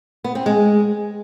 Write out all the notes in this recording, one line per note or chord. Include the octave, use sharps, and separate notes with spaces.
B3
C4
G#3